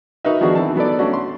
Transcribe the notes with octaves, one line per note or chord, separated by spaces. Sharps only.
D#4 F#4 A#4 B4 D#5 E5
D#3 F3 B3 D4 F#4 G#4
E3 C4 A5
F#3 B3 A4 D5
A3 C#4 D4 F#4
C6